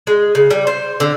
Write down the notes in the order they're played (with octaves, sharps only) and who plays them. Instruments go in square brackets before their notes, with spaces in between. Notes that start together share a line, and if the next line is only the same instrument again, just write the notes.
[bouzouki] G#3
C#3
G3
C5
D3